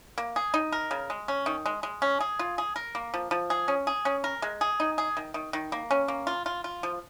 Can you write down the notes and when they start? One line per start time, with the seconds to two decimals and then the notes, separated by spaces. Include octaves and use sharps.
0.18 A#3
0.36 G#4
0.54 D#4
0.72 A#4
0.91 C#3
1.10 G#3
1.28 C#4
1.46 D#3
1.66 G#3
1.83 G#3
2.02 C#4
2.20 G#4
2.39 F4
2.58 G#4
2.76 A#4
2.95 A#3
3.14 F3
3.31 F3
3.50 G#4
3.68 C#4
3.87 G#4
4.05 C#4
4.24 A#4
4.42 G#3
4.61 G#4
4.80 D#4
4.98 G#4
5.17 D#3
5.34 D#3
5.53 D#3
5.72 A#3
5.91 C#4
6.08 A#3
6.27 F4
6.46 F4
6.64 F4
6.83 F3